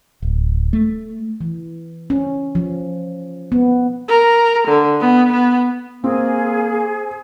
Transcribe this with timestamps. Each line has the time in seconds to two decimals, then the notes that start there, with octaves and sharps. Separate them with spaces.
0.22 D1
0.73 A3
1.41 E3
2.10 C#4
2.55 F3
3.52 B3
4.08 A#4
4.68 D3
5.00 B3
5.33 B3
6.04 A#3 C4 G#4